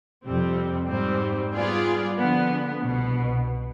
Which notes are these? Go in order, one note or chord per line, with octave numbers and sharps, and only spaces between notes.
F2 C3 G3 C4
G#2 G3 C4
G3 B3 F4 G#4 D5
D3 F3 B3
C2 B2 B3